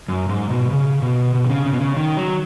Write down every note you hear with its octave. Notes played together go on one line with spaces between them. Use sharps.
F#2
G#2
B2
C#3
B2
B2
D#3
C#3
C#3
B2
C#3
D#3
F#3